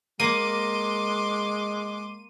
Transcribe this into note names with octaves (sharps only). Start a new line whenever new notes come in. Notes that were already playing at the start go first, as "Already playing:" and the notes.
G#3 A#3 C6 D6 D#7